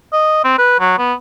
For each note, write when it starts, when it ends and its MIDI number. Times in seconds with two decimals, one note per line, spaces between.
0.13 0.42 75
0.44 0.56 60
0.58 0.77 71
0.80 0.94 54
0.98 1.14 59